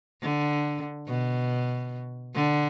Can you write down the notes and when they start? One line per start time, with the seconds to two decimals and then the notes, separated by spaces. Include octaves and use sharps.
0.22 D3
1.07 B2
2.35 D3